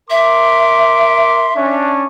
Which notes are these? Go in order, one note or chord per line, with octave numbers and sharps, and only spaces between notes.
A#4 E5 C6 D6
C#4 D4